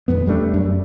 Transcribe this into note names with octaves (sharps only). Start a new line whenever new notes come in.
D#1 G#1 F2 B3
E1 G3 A3 D4
F#2